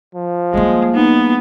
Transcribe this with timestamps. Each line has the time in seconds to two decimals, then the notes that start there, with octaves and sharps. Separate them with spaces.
0.15 F3
0.54 G3 G#3 A#3
0.94 B3 D#4